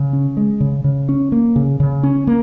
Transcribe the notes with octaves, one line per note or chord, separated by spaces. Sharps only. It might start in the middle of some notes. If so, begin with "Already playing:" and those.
Already playing: C#3
C#4
G#3
C#3
C#3
C#4
A#3
C#3
C#3
C#4
A#3